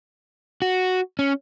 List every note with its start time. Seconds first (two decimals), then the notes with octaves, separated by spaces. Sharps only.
0.62 F#4
1.19 C#4